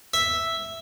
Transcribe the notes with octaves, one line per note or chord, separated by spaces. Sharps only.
E5